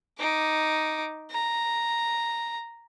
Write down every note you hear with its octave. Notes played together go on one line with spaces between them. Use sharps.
D#4 D6
A#5